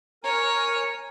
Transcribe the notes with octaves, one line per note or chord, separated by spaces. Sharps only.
A#4 C#5 G#5 A#5